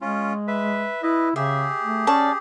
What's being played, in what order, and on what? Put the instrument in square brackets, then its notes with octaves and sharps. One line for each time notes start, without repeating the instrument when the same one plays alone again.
[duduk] G#3 [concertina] C#4 F4
[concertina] B4 E5
[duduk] E4 [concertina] B4 D#5
[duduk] C#3 [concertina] G4 G#4 [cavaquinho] E5
[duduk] A3
[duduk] C#4 [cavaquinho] D5 A5 C#6